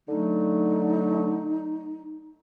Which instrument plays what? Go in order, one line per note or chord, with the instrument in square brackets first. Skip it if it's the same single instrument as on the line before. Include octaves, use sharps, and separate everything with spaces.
[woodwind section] D3 F#3 A3 [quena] D#4